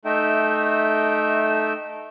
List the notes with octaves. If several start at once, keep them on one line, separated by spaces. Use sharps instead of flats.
A3 D#4 E5 G5